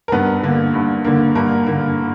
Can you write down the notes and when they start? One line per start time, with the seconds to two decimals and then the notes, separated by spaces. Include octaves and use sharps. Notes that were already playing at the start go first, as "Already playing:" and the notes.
0.08 A#4
0.12 G2 B3 B4
0.43 D3 A#3
0.74 G2
1.04 D3 A#3
1.35 G2 A#3 A#4
1.66 D3 A#3